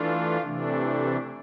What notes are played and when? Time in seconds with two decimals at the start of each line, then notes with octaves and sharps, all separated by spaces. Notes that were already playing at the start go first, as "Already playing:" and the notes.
Already playing: E3 A3 D4 F4
0.41 C3 E3 A3 D4